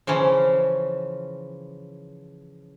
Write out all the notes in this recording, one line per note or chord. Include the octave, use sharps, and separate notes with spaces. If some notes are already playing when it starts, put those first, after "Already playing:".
C#3 E3 F3 C#4